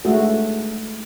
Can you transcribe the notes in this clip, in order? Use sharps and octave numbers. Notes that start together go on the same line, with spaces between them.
G#3 A3 F#4 A4